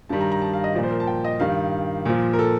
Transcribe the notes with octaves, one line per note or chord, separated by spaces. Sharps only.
G2 D#3 G3 A5
A#5
A#5
A5
F5
D#5
A#2 F3 D5
C5
A#4
A5
G5
D#5
G2 D#3 G3 F5
A#2 F3
A#4
A4